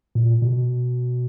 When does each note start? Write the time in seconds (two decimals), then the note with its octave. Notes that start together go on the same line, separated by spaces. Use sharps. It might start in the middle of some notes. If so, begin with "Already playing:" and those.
0.15 A#2
0.42 B2